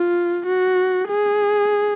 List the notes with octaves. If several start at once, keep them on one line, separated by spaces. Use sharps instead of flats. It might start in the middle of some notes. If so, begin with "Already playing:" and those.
Already playing: F4
F#4
G#4